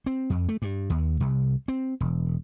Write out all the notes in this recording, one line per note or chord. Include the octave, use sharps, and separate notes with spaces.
C4
F2
A3
G2
D#2
C2
C4
E1